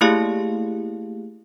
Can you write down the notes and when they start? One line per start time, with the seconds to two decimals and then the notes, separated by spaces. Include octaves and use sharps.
0.01 A3 A#3 E4 G4 G#4 F5